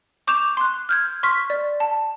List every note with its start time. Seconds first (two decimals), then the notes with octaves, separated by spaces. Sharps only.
0.27 C#6 D6 G6 E7 F7
0.57 C6 F#6
0.89 F6 G6 G#6
1.23 C6 C#6 F6 B6
1.50 D5
1.80 A5